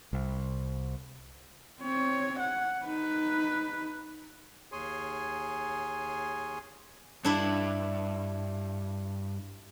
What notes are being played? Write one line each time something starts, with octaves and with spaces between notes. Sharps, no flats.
C2
C4 C#5
F#5
D#4 B4
D#2 G#4 C#5 G#5 C6
G2 D4 E4 E5